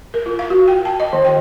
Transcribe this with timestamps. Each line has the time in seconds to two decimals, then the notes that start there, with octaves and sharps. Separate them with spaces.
0.14 A#4
0.26 F4
0.39 F5
0.50 F#4
0.68 G5
0.85 A5
1.00 D#5
1.13 D#3
1.25 G5